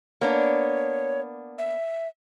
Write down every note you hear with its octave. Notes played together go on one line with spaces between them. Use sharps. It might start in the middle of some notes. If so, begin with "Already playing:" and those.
A#3 B3 D4 C#5
E5